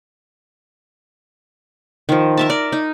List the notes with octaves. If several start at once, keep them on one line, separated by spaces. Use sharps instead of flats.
D#3 F3
A#4 E5 A5
D5
D#4